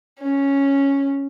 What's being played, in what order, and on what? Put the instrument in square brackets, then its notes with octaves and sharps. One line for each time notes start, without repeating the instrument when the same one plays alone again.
[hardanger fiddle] C#4